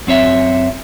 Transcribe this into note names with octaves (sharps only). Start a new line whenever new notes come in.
F#2 C4 C#5 E5